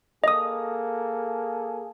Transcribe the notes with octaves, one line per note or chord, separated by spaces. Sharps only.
A#3 G#4 A4 D#5 D#6